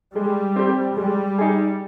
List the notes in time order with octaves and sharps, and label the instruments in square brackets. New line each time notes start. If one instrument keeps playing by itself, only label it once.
[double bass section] G3 [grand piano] G#3
[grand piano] C4 G4
[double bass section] G3 [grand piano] G#3
[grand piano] D#4 G#4